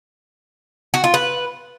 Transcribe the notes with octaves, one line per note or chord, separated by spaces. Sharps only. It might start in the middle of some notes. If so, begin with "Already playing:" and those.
F#4
F4
B4